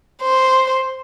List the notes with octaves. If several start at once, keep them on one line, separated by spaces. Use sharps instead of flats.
C5